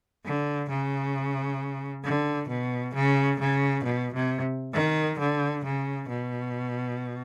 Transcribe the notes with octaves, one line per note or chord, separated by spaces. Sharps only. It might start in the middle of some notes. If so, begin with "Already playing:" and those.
D3
C#3
D3
B2
C#3
C#3
B2
C3
D#3
D3
C#3
B2